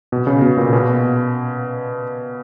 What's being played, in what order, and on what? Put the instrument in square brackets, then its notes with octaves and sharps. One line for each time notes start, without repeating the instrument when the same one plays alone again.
[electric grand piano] B2
C#3
B2
A#2
B2